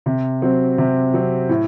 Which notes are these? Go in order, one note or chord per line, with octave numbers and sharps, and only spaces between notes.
C3
F#3 C4
C3
F#3 C4
A2